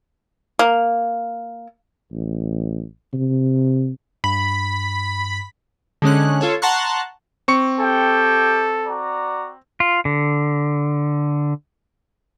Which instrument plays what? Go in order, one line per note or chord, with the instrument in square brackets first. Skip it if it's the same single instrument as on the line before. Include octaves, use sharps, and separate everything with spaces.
[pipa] A#3
[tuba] A1
C3
[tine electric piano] G2 [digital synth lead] B5
[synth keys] D3 G#3 C#4 F#6
F4 A4 C#5
F#5 A5 A#5 C6 C#6 F#6
[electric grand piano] C4 C#6 C#7
[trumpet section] G4 E5 G5 [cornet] A4
[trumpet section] F#4 D5 A#5
[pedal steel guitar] F4
D3